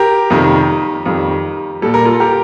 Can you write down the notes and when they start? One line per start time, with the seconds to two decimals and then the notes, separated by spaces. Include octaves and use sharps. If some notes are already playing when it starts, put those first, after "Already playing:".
Already playing: G4 A#4
0.30 F2 C3 D#3 G3
1.06 F2 D#3 G3
1.82 A#2 G3 A4
1.94 A#4
2.05 F4 A4
2.20 G4 A#4